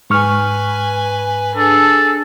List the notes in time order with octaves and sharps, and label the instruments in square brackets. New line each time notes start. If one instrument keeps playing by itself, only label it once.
[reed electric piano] G#2 C#6 F6 [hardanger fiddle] B4 G#5
[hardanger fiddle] D4 G#4 [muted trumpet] A4